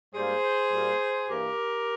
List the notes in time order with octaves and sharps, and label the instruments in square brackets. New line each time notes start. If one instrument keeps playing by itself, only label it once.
[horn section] G#2 G3 A#3 G#4 C5
A#2 G3 A#3
G2 E3 A#3 G4 A#4